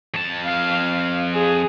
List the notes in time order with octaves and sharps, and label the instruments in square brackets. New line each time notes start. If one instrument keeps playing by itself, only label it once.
[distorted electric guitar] F2 A5
[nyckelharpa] F5
G#4